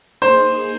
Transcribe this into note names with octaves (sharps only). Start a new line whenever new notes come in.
A#3 D#4 G#4 C5